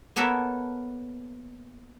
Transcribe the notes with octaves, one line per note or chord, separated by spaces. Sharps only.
A#3 B3 A4 A#4 C#5 E5